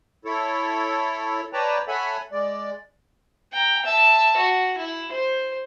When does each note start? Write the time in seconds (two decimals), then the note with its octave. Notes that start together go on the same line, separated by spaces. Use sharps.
0.25 E4 A4 C#5
1.53 B4 C#5 D5 G5 A5 A#5
1.88 A4 C#5 E5 F#5 G#5 B5
2.32 G#3 D5
3.53 G5 A#5
3.85 E5 A5
4.37 F#4
4.78 E4
5.12 C5